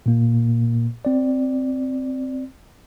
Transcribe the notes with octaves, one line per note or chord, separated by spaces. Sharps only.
A#2 A#3
C4 D5